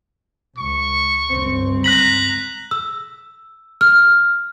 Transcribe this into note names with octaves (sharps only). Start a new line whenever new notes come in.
C#2 C#6
G1 C#2 C4
A#5 F#6 B6 F#7
E6
F6